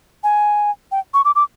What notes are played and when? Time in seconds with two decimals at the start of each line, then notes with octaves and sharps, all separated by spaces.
0.24 G#5
0.92 G5
1.14 C#6
1.25 D6
1.36 D6